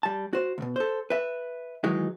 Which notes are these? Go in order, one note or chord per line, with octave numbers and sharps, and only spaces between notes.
G3 A5
F#4 C5
D2 B2
A4 C5
B4 E5
D#3 E3 F#3 G#3 D#4